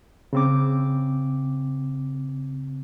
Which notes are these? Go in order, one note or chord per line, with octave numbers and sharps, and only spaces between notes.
C#3 C4 D6